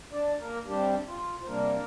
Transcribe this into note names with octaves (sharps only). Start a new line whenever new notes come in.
D4 D5
A#3 A#4
C3 G3 D4 G4
F4
C5
C3 G3 A#3 D4 A#4